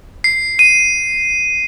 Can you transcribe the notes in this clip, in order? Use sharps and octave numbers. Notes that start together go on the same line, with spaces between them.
C7
D#7